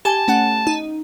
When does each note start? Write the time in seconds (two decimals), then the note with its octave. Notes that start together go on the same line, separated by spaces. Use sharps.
0.05 G4 G#5 A5
0.28 A3 C#4 F#5
0.67 D#4